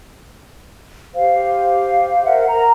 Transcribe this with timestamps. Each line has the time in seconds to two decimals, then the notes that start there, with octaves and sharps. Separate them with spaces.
1.15 G4 C5 F5
2.24 A#4 C5 E5 F#5
2.48 A#4 A#5